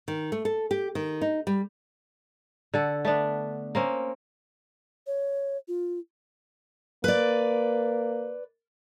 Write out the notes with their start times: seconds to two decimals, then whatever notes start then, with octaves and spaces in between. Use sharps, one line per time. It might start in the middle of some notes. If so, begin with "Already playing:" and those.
0.08 D#3
0.32 A3
0.45 A4
0.71 G4
0.95 D#3
1.21 D#4
1.47 G3
2.74 D3 A4 F#5
3.05 A3 B3 D4
3.75 A#3 C4 C#4
5.07 C#5
5.68 F4
7.04 A#3 B4 D5